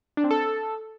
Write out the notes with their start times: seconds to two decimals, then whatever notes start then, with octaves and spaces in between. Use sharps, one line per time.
0.17 D4
0.24 C4
0.31 A4